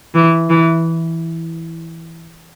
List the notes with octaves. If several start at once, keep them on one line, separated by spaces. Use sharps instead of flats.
E3
E3